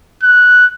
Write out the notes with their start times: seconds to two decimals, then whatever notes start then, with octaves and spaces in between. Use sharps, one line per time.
0.23 F#6